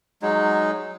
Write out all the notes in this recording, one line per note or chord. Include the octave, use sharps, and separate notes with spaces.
F#3 G#3 D#4